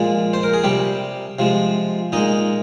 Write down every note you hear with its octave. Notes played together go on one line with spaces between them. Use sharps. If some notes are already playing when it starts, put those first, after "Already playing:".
Already playing: A#2 F3 G#3
C5
A#4
G#4
C3 G3 G4
C3 F3 G#3
A#2 G#3 D#4 D#5